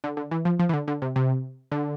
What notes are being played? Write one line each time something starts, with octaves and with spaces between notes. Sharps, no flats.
D3
D3
E3
F3
F3
E3
D3
D3
C3
C3
D3